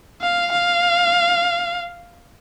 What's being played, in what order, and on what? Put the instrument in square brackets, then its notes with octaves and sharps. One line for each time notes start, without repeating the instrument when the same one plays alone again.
[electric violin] F5
F5